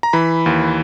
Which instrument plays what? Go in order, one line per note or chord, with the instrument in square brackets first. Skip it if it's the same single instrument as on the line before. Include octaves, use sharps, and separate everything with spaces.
[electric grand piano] A#5
E3 B5
D#2